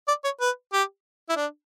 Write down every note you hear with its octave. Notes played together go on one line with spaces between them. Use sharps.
D5
C#5
B4
G4
E4
D4